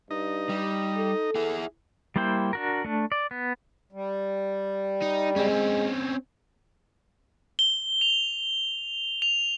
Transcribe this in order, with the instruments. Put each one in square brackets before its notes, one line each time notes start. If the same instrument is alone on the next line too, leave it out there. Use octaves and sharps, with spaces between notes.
[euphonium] G2 [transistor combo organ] D#4 D#5
[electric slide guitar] G3
[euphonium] A4
[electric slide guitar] E4 G#4
[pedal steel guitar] G3 A#3 E4 C5 G5
D4 F#4 A#4
A3 D4
D5
B3
[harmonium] G3
[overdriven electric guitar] D#4
[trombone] G#3 [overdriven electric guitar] C4 C#4
[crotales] G7
F7
F7